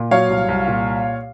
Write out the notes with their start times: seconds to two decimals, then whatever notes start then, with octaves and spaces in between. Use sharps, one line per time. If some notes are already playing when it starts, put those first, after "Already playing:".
Already playing: A#2
0.11 F#3 C#5 F5
0.30 C2
0.48 C2
0.68 A#2